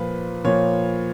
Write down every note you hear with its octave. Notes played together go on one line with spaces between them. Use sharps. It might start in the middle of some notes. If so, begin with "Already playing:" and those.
Already playing: A#2 F3 B4
A#2 F3 C#5